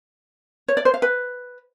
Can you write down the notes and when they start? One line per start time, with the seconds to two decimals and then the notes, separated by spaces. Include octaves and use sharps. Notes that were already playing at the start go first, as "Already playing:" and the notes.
0.68 C#5
0.77 D5
0.85 C5
0.94 F5
1.02 B4